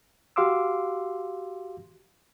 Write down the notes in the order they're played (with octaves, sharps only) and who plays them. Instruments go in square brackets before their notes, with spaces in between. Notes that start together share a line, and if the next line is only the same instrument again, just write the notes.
[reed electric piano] F#4 G4 F5 C6 D6 E6